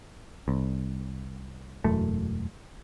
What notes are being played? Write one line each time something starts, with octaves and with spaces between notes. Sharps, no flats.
C2
E1 F#2 A3